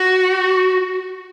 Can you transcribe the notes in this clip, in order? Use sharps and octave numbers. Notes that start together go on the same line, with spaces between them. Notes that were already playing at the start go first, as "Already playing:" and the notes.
Already playing: F#4